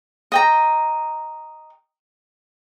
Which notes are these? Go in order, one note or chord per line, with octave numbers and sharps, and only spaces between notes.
D#5 G5 A#5